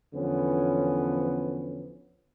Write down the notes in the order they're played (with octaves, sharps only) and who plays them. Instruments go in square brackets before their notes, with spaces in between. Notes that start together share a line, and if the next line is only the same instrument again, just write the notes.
[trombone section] E2 D3 F3 B3 C#4